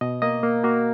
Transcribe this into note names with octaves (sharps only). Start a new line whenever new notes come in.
B2 D#5
A#3 D#5
A#3
A#3 F#4